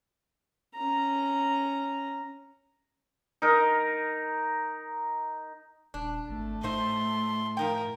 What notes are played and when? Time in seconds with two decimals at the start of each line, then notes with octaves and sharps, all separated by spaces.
0.75 C#4 A#5
3.42 D#4 A#4
5.94 D#1 D4
6.29 G#1 A3
6.63 A2 D#4 C5 E5 C6
7.57 F3 D#4 A#4 G5